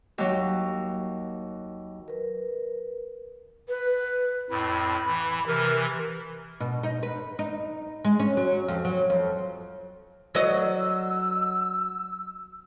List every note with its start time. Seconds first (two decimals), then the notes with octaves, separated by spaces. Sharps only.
0.18 D#2 F#3
2.08 A#4 B4
3.69 B4
4.50 F2 A2 B5
5.07 E3
5.47 C3 E3 A#4
6.60 B2
6.83 D#4
7.03 B4
7.39 D#4
8.05 G#3
8.20 C#4
8.37 F#3
8.68 F2
8.85 F#3
9.10 F2
10.35 F#3 D#5 E6